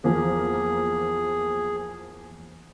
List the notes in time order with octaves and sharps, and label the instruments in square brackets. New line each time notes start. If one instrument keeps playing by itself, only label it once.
[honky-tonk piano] E2 F3 A#3 [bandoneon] G#4